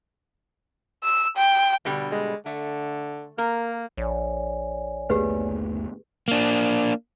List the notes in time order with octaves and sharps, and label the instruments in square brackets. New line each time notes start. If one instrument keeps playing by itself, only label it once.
[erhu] E6
G5
[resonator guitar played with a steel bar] B2 D3 G3
[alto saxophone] G#3
[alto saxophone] D3 [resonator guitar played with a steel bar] A3
[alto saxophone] A#3 [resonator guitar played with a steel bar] A#4
[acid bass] A#1 [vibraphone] C#5 D5 G#5
[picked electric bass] G1 D#2 A3 [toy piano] G4 G#4 B4
[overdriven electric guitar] A#3 D4